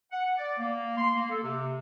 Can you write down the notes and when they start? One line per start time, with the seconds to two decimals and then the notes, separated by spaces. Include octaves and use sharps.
0.12 F#5
0.37 D5
0.58 A#3
0.97 C6
1.15 A#3
1.30 A4
1.43 C3